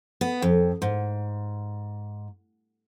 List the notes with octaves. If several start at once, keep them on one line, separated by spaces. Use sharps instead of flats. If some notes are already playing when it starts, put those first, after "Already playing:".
B3
F2
G#2